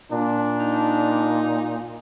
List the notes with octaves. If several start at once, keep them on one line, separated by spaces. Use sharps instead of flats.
A#2 D4
D#4